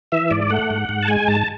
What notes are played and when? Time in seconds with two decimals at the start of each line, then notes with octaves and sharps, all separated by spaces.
0.12 E3 E5
0.31 G#2 D5
0.50 A3 F#5
0.70 G#2
0.89 G#2
1.03 A5
1.08 G#3 G#5
1.28 G#2 A5